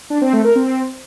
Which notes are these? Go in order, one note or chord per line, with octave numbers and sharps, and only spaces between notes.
D4
C4
A3
A#4
C4